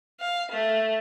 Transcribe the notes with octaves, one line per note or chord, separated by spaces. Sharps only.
F5
A3